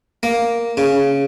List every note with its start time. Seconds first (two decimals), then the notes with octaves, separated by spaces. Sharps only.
0.23 A#3
0.77 C#3